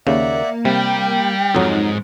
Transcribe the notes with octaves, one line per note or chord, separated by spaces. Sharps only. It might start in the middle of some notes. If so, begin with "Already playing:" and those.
D#2 C#3 A#3 D5 E5 F#5
C3 G3 G5
G5
B1 F2 G#2 F#3 D#4